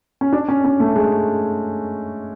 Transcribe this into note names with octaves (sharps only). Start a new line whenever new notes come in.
C#4
D4
C#4
C#4
A3
G#3